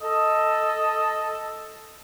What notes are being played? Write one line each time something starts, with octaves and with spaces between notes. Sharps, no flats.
A4 D#5